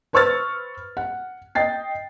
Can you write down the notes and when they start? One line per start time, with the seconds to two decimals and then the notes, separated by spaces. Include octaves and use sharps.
0.13 B4 C5 C#6 E6 F6 A6
0.97 F#5
1.55 D#5 G5 A6 C7